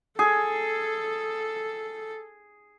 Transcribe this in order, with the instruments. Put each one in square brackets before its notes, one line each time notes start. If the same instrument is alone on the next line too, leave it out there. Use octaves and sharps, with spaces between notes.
[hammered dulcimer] G#4 [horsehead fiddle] A4